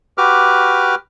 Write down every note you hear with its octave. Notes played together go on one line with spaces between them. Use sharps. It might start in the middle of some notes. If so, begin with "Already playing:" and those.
F#4 G4 B4 D6 F6